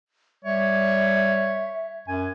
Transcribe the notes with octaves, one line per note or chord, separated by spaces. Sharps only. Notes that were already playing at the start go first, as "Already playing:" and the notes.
G3 C#5 E5
F#2 G#5